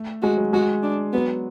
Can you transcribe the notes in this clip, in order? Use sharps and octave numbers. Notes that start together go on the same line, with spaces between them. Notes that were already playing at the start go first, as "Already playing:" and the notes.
Already playing: A3
G#3 F#4
F#3
G#3 F#4
D4
F#3 B3